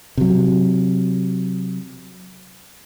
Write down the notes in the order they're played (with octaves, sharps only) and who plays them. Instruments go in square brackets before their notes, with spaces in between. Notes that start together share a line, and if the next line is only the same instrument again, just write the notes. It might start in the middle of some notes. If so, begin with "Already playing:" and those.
[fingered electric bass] C3 F#3